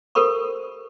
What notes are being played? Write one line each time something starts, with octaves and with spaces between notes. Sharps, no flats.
G4 A4 A#4 C5 B5 C#6